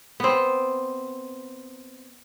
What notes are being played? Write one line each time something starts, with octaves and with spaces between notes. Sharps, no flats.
B3 C4